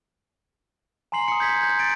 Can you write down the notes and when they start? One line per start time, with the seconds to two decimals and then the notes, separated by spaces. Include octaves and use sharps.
1.12 G#5 A#5 C6 C7 F#7
1.28 D#6 C#7
1.40 G6 G#6 B6
1.63 G6
1.79 G6 A6 D7